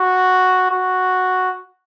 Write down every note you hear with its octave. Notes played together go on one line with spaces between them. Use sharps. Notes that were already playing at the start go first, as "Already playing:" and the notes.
Already playing: F#4
F#4